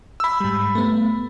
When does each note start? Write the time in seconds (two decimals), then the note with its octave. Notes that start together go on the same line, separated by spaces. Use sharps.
0.20 B5 E6
0.40 G#2 G3
0.75 A3 B3